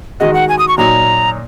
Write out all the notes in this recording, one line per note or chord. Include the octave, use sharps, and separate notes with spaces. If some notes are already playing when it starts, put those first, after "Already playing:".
D#3 G#3 F#4 D#5
F#5
G#5
D#6
C#6
A#2 F#3 D#4 A#5